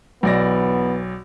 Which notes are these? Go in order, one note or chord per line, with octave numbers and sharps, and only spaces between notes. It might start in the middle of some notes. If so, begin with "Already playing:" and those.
B1 E2 B3 D5 A#6